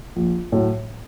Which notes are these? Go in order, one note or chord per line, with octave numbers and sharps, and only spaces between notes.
A#1
A2 F#3